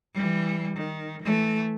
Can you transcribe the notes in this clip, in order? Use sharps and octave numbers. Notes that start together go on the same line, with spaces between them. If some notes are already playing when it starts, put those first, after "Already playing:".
E3 G3
D#3
E3 A3